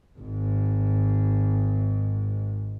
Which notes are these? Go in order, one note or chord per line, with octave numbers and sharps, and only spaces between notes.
G#1 G#2